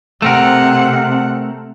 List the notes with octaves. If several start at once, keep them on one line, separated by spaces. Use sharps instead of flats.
C3 A3 C4 A#4 F#5